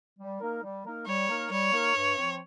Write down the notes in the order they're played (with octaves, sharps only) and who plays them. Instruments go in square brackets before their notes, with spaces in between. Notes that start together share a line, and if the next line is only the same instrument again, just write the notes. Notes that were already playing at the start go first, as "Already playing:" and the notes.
[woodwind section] G3
A#3 D#4 A#4
G3
A#3 D#4 A#4
[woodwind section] G3 [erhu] C#5
[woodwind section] A#3 D#4 A#4
[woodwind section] G3 [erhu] C#5
[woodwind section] A#3 D#4 A#4
G2
F3 C4